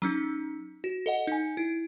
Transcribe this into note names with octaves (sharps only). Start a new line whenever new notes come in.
F#3 C#4 D#4
F#4
A4 D#5 F#5
D#4 G#5
E4